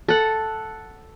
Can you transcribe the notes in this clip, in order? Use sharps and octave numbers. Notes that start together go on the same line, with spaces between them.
A4 F#5